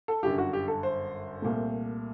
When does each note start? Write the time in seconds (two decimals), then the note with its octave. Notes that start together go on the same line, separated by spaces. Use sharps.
0.08 A4
0.23 G1 F#2 D3 G4
0.38 F#4
0.53 G4
0.68 A4
0.83 C5
1.42 C2 A#2 A3